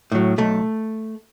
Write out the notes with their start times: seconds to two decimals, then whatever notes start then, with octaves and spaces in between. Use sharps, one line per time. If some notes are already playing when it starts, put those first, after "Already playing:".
0.12 A2 F#3
0.38 B1 A3